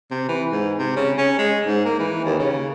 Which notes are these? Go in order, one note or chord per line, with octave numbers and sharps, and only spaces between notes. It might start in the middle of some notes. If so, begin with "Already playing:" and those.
C3
E3
G#2
C3
C#3
C#4
G#3
G#2
A#3
E3
D#2
C#3